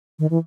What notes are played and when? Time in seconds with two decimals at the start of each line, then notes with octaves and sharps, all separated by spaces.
0.19 D#3
0.30 E3